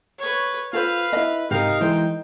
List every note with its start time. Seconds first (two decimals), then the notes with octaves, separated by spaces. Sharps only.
0.19 B4 C#5
0.73 F4 A4 B4 C5 F5
1.13 E4 D#5
1.51 G#2 C3 D#4 G4 A#4 F5
1.81 E3 G#3 E4 C5 G5